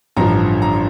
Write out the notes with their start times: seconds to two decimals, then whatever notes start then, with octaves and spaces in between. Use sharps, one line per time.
0.16 A1 G2 D3 F3 A#5
0.62 A#5